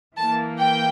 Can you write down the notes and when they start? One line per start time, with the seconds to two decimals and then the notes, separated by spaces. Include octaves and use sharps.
0.17 E3 A#3 A5
0.58 G5